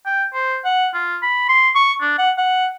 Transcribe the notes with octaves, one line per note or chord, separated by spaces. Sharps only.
G5
C5
F#5
F4
B5
C6
C#6
D4
F#5
F#5